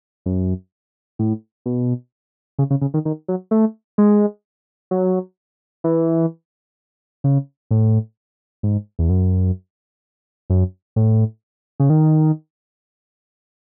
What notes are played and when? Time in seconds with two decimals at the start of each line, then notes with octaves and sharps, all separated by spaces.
0.26 F#2
1.19 A2
1.66 B2
2.59 C#3
2.70 C#3
2.81 C#3
2.94 D#3
3.05 D#3
3.28 F#3
3.51 A3
3.98 G#3
4.91 F#3
5.84 E3
7.24 C#3
7.71 A2
8.63 G#2
8.99 E2
9.09 F#2
10.50 F#2
10.96 A2
11.80 C#3
11.90 D#3